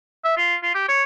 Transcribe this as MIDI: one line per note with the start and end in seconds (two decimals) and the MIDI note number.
0.25 0.37 76
0.37 0.56 65
0.63 0.74 65
0.75 0.86 67
0.88 1.04 73